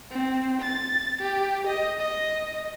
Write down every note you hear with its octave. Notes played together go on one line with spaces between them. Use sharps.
C4
A6
G4
D#5
D#5